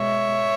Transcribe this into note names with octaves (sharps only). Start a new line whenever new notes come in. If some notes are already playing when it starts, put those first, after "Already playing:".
Already playing: B2 G#3 C#5 E5